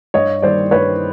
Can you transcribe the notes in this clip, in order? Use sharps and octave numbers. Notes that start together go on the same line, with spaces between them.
G2 C#5 D#5
D#3 G3 A#3 C5 D5
G2 B4 C#5